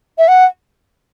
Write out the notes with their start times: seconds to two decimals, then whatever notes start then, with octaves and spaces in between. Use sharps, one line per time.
0.18 E5
0.28 F#5